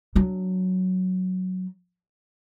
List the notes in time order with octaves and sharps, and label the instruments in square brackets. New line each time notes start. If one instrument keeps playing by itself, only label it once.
[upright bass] F#3 D4